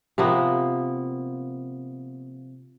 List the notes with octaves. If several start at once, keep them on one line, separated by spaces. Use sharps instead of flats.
C3 F3 A#3 B3